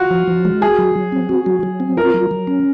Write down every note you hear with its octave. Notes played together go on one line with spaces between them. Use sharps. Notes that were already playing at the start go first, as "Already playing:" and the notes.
Already playing: F4 F#4
F3
F3
G#3
F#4 G#4
F#3
F#3
C4
F#4
F#3
F#3
C4
F4 A#4
F#3
F#3
C#4